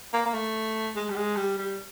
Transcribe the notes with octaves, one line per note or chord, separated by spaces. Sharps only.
A#3
A#3
A3
G#3
G3
G#3
G3
G3